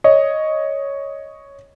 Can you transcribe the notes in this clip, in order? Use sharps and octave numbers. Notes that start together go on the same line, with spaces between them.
C#5 D#5